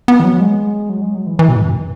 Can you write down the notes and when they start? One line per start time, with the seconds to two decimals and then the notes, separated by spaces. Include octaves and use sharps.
0.08 B3
0.20 E3
0.24 F#3
0.40 G#3
0.89 F#3
1.01 G#3
1.15 F#3
1.27 E3
1.39 E3
1.49 B2
1.56 G#2
1.63 F#2